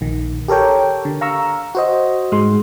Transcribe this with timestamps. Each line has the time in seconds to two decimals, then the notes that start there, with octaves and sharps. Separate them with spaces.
0.01 A#1 D#3
0.48 G4 A4 A#4 C#5 G5
1.05 D3
1.21 F5 A#5 C#6 E6
1.75 F#4 C5 D#5
2.32 G#2 G#3 C6